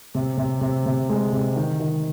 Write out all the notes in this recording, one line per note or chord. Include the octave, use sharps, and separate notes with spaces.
C3
C3
C3
C3
G#3
C3
D#3
D#3